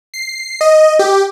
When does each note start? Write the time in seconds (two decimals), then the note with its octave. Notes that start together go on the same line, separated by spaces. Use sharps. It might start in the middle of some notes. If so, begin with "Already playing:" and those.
0.14 C7
0.61 D#5
0.99 G4